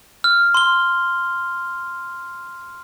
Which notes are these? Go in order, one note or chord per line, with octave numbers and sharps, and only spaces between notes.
F6
C6 G7